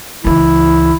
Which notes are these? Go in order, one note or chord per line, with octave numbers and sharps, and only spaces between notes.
C#2 E3 E4